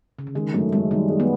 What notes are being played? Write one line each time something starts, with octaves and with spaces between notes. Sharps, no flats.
C#3
D3
D#3 G#3
F#2 A3
F#2 G#3
D#3 G3
G#3
B3